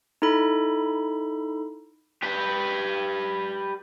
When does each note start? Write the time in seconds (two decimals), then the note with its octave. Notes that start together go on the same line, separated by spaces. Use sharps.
0.22 D#4 E4 A4 B5
2.23 G4 B4